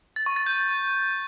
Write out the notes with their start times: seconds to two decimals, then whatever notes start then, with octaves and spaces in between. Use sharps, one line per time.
0.16 A6
0.26 C#6
0.36 A6
0.46 G6